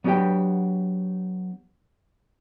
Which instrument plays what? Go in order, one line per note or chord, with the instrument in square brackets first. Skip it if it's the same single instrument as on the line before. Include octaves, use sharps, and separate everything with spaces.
[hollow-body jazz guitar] F#3 B3 D4 E4 G4 G5